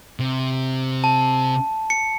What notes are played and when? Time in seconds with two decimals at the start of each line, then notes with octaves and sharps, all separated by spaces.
0.20 C3
1.04 A5
1.90 C#7